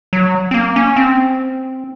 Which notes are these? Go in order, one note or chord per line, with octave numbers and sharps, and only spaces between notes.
F#3
C4
A#3
C#4
C4